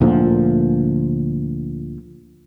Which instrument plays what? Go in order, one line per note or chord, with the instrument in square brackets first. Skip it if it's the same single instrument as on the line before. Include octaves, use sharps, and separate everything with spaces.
[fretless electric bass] D2 A#2 D3 F3